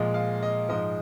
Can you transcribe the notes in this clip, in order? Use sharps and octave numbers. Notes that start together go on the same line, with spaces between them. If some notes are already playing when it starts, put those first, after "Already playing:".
Already playing: A#2 F3 G#3 D#5
F5
D#5
G#2 F3 G#3 D#5